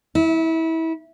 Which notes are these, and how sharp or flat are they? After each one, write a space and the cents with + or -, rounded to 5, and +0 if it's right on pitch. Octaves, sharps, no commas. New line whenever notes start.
E4 -25